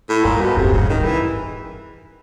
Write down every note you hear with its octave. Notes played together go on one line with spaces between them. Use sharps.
A2
G2 A#2
B2
G#2 C3
G2
G#2 C#3
G#2
G2 D#3
E3